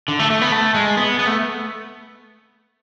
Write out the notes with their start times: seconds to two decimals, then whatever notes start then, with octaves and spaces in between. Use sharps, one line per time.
0.08 D3
0.19 A3
0.30 A3
0.41 B3
0.52 A3
0.74 G#3
0.97 B3
1.19 B3
1.27 A3